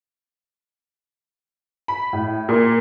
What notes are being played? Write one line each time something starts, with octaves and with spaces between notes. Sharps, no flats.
B5
A2
A#2